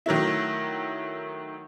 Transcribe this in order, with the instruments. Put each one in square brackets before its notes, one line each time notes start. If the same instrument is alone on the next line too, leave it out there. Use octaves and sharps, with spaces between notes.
[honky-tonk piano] D#3 F#3 A3 E4